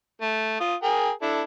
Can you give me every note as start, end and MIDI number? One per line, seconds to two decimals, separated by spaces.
0.22 0.57 57
0.60 0.75 65
0.60 0.75 87
0.83 1.10 68
0.83 1.10 70
0.83 1.10 79
1.22 1.42 62
1.22 1.42 64
1.22 1.42 69